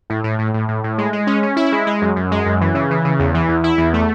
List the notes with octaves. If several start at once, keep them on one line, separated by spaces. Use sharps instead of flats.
A2
A2
A2
A2
A2
A2
G#3
G#3
C#4
C#4
E4
G#3
G#3
F#2
F#2
G#3
F#2
E3
C#3
E3
C#3
E2
E3
E2
E4
E2
A3